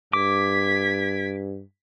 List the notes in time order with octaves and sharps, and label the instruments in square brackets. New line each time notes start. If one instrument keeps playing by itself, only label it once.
[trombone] G2 [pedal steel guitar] D6 [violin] G#6 B6